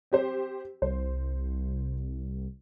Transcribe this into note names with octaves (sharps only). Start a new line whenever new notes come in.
C4 G4 C5
C2 C5